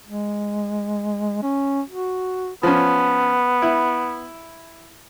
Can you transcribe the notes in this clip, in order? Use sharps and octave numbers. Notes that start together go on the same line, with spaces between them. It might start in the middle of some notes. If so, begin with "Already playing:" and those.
G#3
C#4
F#4
F3 B3 C#4
E4